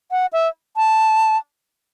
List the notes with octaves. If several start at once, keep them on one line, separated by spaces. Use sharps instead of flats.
F#5
E5
A5